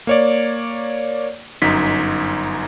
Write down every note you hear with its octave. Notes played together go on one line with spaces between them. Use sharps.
A#3 C#5 D5
G1 F#2 D#4 B6